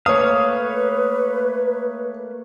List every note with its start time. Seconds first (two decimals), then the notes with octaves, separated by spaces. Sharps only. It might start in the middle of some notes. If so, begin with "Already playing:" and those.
0.06 A3 A#3 B4 C#5 F5 D#6